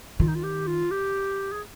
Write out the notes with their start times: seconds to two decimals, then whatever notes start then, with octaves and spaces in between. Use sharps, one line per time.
0.20 D#3 F4
0.28 D#4
0.35 F4
0.43 G4
0.67 F4
0.91 G4
1.52 G#4